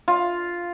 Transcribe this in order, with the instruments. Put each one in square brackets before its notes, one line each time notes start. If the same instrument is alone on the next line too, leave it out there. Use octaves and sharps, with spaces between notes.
[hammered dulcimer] F4